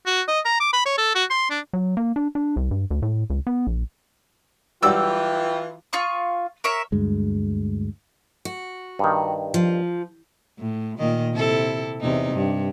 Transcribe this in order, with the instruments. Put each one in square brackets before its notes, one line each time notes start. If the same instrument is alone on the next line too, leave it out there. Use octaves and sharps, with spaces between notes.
[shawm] F#4
D#5
A#5
D6
B5
C#5
A4
F#4
C6
D4
[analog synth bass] F#3
A#3
D4
D4
C2
G2
D2
A2
C#2
B3
A#1
[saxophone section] E3 F4 [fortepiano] F#3 G3 F#4 [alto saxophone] G5 [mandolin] D6 E6
[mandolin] F4 F5 C#6 D#6
A#4 C#5 E5
[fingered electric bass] D2 G2 G#3
[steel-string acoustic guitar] F#4
[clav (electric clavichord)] G2 D#3
[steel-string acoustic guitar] F3
[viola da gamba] A2
A#2 D#3 D#5
C3 E4 A4
E2 C3 D#4
G2